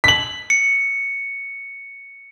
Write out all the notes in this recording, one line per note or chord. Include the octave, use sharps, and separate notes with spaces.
B6 F#7
C#7